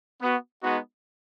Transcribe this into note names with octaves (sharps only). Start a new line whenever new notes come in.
B3 F#4
G#3 B3 D#4 F#4